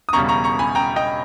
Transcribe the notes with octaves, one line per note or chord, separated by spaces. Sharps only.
D#6
E1 E2 C#3 G3 A#5 C#6
A#5 C#6
A#5 C#6
G#5 B5
G5 A#5
D#5 G5